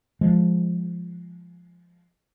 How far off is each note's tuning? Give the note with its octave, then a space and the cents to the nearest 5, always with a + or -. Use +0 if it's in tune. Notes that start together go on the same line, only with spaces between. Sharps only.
F3 +0 G#3 +0